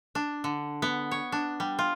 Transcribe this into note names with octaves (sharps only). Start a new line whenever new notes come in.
D4
D3
B3
C#5
D4
G3
F4